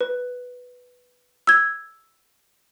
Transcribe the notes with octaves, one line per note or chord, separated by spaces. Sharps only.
B4
E6 G#6